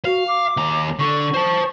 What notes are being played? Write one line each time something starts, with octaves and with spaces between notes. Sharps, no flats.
F#4 F5
D6
D#2 A#5
D3 C#6
C5 A5